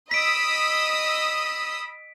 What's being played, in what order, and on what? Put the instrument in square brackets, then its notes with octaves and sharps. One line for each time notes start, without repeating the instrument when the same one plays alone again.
[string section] D#5 D#6 E6 [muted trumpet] B5 [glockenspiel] B6 D7